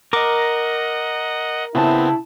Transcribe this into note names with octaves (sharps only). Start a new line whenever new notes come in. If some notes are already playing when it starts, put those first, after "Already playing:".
A#4 D#5 F#5 D6
C#3 B3 C4 E4 A5